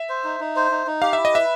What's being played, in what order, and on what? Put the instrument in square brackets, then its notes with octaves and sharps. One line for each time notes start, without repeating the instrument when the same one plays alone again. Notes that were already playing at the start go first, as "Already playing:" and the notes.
Already playing: [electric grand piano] E5
[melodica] C5
D#4
D#4
C5
D#4
D#4
[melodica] G4 [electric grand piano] F5
[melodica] E4 [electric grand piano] E5
[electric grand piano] D#5
[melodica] B4 [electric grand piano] E5